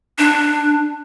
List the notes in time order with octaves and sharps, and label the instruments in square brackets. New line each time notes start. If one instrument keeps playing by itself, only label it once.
[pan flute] D4